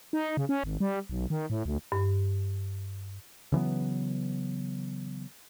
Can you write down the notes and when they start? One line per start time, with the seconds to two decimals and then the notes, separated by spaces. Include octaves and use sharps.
0.13 D#4
0.37 C#3
0.49 C#4
0.64 G#1
0.80 G3
1.09 B1
1.30 D#3
1.50 A2
1.66 D2
1.92 G2
3.52 C#3 E3 F#3 B3